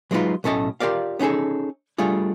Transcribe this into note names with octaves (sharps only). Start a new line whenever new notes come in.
F#3 G#3 B3 D#4 F4 B4
B1 A2 A3 C#4 D#5 A5
F4 G4 A#4 D5 F5
B3 C#4 D#4 G#4 A4
G3 A3 D4 F4 G#4